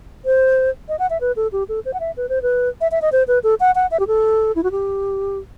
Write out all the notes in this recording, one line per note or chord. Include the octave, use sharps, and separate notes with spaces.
C5
D#5
F#5
E5
B4
A4
G4
A4
C5
F#5
E5
B4
C5
B4
E5
E5
D#5
C5
B4
A4
F#5
F#5
E5
G4
A4
E4
F#4
G4